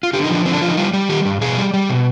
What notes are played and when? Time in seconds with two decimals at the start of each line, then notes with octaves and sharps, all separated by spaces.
0.03 F4
0.13 D3 G4
0.24 D#4
0.29 F3
0.35 D4
0.45 D3 C4
0.53 D4
0.61 F3 F4
0.69 D#4
0.77 G3 F4
0.93 G3
1.09 D#3 G4
1.25 G2
1.41 B2 G#4
1.58 G3
1.74 G3
1.89 B2